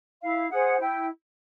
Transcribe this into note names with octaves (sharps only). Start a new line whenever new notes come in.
E4 F5
G#4 C5 F#5
E4 G5